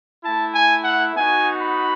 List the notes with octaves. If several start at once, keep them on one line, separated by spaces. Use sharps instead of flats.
A3 E4 A5
G#5
F#5
B3 D#4 F#4 G#5
B5